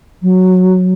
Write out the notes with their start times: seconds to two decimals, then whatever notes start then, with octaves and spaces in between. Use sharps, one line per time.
0.22 F#3